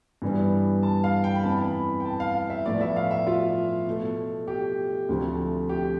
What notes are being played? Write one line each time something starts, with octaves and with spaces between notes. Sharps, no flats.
G2 E3 G3 B3
A5
F5
G5
B5
F2 E3 B3 A5
B5
G5
A5
F5
F5
E5
A2 F3 B3 D5
E5
F5
E5
F4
B2 A3
G4
D2 C3 F3 A3
G4